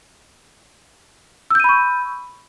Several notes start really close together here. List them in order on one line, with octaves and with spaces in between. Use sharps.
E6 G6 D#7 B5 C#6